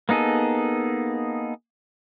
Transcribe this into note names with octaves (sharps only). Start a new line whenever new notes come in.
A#3 B3 D#4 G#4 A4